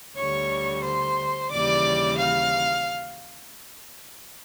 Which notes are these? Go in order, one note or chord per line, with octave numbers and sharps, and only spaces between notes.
D2 D3 G3 C#5 C#6
C5 C6
D#2 C#3 E3 G3 D5 D6
F5 F6